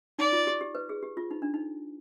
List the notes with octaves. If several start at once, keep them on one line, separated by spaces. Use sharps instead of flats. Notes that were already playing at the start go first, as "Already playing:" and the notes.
D#4 D5
F4
G4
G4
B4
G#4
G4
F4
D#4
D4
D#4